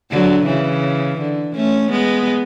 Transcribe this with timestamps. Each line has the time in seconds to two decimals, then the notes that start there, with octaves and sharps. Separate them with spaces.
0.11 D3 F#3
0.46 C#3 E3
1.19 D3
1.55 A3 C#4
1.91 G#3 B3